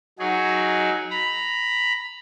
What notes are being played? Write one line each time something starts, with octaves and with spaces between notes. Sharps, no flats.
F#3 D#4 F#4 G#4
A#5 B5